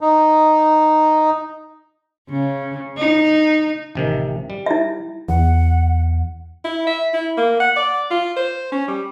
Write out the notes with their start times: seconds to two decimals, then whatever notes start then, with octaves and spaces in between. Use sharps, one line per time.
0.01 D#4
2.30 C#3
2.97 D#4
3.95 A1 C3 D#3
4.50 G3
4.66 E4 E5
5.29 E2 F#5
6.65 E4
6.87 E5
7.13 E4
7.37 A#3
7.60 F#5
7.77 D5
8.11 F4
8.37 C5
8.72 C#4
8.88 G3